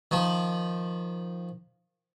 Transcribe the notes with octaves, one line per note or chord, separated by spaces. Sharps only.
D#3 F3